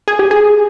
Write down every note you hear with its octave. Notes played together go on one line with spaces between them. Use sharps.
G#4
G4
G#4